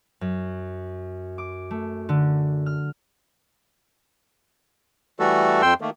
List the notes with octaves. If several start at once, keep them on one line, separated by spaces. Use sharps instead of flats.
F#2
D6
A3
D3
F6
E3 G3 A3 F#4 A4
F2 G5 C6 E6
D#3 A3 A#3